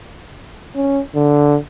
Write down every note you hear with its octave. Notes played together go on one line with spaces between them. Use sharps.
C#4
D3